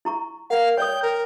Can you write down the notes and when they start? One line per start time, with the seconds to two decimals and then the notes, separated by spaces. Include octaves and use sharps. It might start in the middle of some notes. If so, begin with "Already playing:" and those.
0.05 E4 A#5 C#6
0.50 A#4 F5 F#5
0.77 C#5 D5 G5 D#6 G6
1.03 A#4